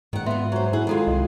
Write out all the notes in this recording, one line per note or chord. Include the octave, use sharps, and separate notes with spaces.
G#2 D#3 F#5
B3 F4 E5 C6
F#3 C5
E4 G#4 F#5
D#3 G#3 F4 F#4 A4
C2 D#5